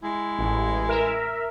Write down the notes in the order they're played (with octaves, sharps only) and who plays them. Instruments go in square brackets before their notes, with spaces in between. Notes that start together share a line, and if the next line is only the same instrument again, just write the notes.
[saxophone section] G#3 E4
[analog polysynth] A1
A#4 E5